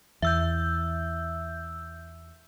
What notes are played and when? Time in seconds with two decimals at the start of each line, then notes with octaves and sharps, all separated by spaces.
0.22 E2 E5 E6 G6